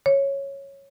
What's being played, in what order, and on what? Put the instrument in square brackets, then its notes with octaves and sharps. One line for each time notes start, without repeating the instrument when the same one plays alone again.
[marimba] C#5